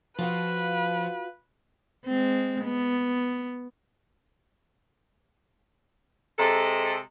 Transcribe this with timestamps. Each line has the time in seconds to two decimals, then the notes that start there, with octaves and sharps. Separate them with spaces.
0.18 F3 F4 F#4 B4 F5
2.06 G#3 C4
2.65 B3
6.38 C3 G#3 A4